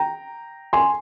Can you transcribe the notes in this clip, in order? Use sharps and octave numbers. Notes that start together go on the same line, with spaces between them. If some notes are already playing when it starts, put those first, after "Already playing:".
Already playing: G5 A#5
G#5 C6